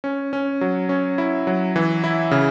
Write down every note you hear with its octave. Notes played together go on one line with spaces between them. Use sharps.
C#4
C#4
F#3
C#4
E4
F#3
E3
E4
C#3